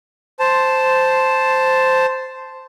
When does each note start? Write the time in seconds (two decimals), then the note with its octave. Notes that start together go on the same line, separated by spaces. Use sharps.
0.39 C5 A5